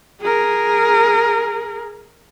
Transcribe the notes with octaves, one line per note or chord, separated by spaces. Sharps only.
G#4 A#4